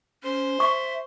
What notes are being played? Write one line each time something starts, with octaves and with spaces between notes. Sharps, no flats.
C#4 C5
E5 C#6